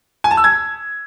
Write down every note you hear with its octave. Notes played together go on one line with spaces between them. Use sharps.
G#5
A5
E6
G#6